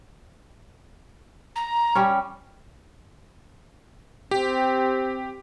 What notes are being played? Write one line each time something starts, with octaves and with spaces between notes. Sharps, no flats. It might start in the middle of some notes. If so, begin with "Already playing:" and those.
A#5
G3 C#4
C4 G4